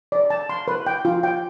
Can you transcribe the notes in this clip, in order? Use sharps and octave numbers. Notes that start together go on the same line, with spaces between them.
D5
A5
C6
B4
G5
F4
G5